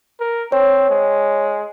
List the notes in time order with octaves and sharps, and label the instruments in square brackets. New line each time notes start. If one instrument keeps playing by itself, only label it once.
[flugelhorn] A#4
[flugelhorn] C4 [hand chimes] C#5
[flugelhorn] G#3